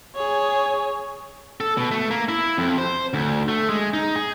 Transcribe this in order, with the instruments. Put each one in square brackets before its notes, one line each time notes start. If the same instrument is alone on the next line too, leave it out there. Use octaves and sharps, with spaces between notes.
[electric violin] G#4 C#5
[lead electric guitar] A4
B2
A3
A#3
E4
F2
C5
D2
A3
G#3
D#4
G#4